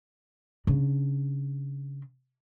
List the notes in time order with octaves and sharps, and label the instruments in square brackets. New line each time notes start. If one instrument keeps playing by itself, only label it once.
[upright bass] C#3 D4